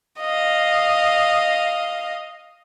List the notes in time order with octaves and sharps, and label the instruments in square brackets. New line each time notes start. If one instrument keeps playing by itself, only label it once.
[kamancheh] D#5 F5